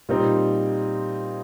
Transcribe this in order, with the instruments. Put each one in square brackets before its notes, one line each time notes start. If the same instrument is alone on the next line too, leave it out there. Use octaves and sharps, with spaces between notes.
[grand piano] A#2 G3 C4 D#4